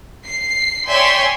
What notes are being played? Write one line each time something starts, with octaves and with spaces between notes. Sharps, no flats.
C7
C#5 D5 E5 G5 G#5 C6